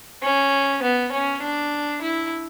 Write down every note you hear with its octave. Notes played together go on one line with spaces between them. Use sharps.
C#4
B3
C#4
D4
E4